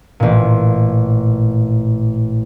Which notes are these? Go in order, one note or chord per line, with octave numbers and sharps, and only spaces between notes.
A1 A#2